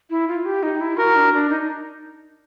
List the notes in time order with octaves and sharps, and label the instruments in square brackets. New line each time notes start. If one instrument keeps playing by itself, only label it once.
[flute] E4
F4
G4
D#4
E4
[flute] F#4 [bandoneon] A#4
[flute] D4
D4
D#4